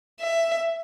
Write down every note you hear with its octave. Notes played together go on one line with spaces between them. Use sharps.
E5